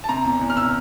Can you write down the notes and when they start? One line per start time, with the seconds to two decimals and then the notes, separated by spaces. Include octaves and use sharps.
0.04 A5
0.09 C3 A#5
0.25 E2
0.41 E2
0.50 F6
0.56 C3 E6